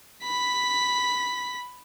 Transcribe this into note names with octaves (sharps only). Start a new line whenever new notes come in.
B5 B6